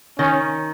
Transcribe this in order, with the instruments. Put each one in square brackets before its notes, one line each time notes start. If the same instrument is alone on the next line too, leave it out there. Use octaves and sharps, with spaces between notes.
[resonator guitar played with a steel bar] D#3 [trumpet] C#4